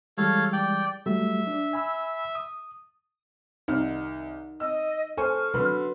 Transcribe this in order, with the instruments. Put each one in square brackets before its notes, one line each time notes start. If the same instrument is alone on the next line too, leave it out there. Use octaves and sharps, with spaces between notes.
[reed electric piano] E3 G3 G#3 [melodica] A4 C#5 F5
[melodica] D5 G5
[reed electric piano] F#3 G3 A3 [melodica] E5
[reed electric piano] D4
G#5 B5 E6
D#6
[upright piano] C2 F6 [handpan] D#4
[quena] D#5 [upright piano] E6
[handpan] A4 [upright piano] C5 G#5 C#6 [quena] F6
[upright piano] D3 B5 C6 [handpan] F#3 B4